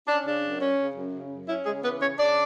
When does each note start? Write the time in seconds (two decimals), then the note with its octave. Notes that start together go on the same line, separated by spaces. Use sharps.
0.08 C#4 D4
0.26 C#3 D4
0.43 F#2
0.61 C#4
0.78 C#3
0.96 F#2
1.13 C#3
1.31 F#2
1.48 C#4 E4
1.66 C#3 G#3 G#4
1.83 E3 B3 B4
2.01 C#3 C#4 C#5
2.18 C#3 D4 D5